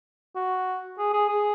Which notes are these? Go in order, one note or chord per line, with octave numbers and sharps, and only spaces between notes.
F#4
G#4
G#4
G#4